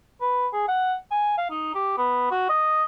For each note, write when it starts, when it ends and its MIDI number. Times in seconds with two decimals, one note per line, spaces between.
0.20 0.47 71
0.53 0.66 68
0.68 0.95 78
1.11 1.34 80
1.38 1.49 77
1.50 1.71 63
1.74 1.96 67
1.97 2.28 59
2.31 2.45 66
2.49 2.83 75